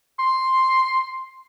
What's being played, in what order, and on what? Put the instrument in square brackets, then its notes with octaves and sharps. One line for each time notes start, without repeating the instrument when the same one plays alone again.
[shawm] C6